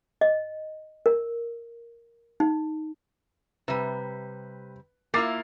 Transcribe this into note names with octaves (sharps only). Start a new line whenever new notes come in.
D#5
A#4
D#4
C3 G3 B4
A#3 E4 F4 D6 A6 C7